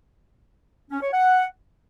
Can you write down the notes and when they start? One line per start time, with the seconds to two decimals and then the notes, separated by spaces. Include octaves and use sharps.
0.90 C#4
1.01 C#5
1.12 F#5